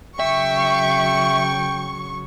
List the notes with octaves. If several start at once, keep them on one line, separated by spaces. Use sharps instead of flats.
C#3 F#3 E5 G5 C#6